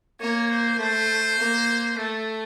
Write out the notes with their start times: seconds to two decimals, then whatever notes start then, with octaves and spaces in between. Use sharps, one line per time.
0.20 A#3 C#5
0.50 C5
0.79 A3 C5
1.39 A#3
1.97 A3 A4